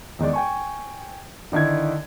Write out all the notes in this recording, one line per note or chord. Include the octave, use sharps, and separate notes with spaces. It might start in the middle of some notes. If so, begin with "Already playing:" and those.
E2 D#3 G#3 D5
G5 G#5 C#6
D3 D#3 D4 E4 G#6